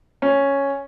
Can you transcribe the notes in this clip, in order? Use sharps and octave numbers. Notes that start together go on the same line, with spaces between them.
C#4